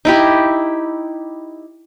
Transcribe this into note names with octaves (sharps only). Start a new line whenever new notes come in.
D#4 E4 G4